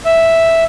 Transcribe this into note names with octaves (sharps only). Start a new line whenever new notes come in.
E5